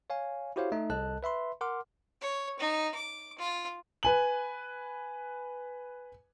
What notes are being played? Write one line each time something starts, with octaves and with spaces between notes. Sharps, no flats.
C#5 F5 G#5
E4 F#4 G4 C5 C#5 F5
A3 D#4 E5
C2 A4 D#5 A5 F#6
B4 E5 B5 C6
A#4 F#5 C6 D6 F6
C#5
D#4
D6
F4
B4 G#5 F#7